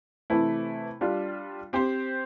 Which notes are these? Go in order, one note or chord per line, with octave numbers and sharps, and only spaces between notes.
C3 E3 A3 E4
G3 D4 F4
C4 G4 C5